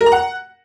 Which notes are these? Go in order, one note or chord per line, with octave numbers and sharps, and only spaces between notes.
A#4
A#5
F#5